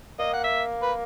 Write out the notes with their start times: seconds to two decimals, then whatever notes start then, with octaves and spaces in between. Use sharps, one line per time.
0.19 A#3 D#5
0.33 F#5
0.44 E5
0.83 B4